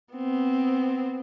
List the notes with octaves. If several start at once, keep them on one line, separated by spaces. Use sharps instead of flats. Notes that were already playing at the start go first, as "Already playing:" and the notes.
B3 C4